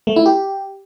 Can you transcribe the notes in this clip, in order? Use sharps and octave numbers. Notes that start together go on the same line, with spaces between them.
A3
E4
G4